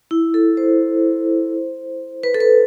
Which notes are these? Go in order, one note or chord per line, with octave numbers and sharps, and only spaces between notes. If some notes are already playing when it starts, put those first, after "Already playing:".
E4
A4
C5
B4
A4
B4